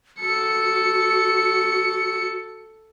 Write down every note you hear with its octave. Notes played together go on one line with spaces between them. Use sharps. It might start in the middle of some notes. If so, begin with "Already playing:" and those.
F#4 A4 C#7